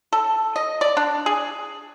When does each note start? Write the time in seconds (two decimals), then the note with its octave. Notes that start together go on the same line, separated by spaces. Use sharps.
0.13 A4
0.56 D#5
0.81 D5
0.97 D4
1.26 G#4